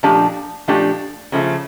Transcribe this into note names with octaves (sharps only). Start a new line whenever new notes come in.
A#2 F3 A3 D4 G4
A#2 F3 A3 D4 G4
C#3 F3 A3